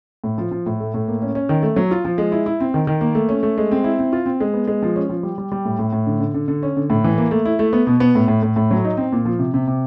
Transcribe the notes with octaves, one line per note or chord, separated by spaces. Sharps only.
A2
F3
F3
A2
A3
A2
A#3
C#4
C#4
D#3
A3
F#3
F4
F3
G#3
E4
E4
C4
D#3
D#3
A#3
A3
C#4
A3
G#3
C4
E4
C4
F4
C4
G#3
B3
G#3
F3
C#4
F3
G3
G3
G3
A2
A2
A2
D3
D3
D3
D3
C#4
D3
A2
E3
A#3
A3
E4
A3
B3
B2
B3
A2
A2
A2
A2
F#3
D#4
C4
A#2
F3
C3
C3
C3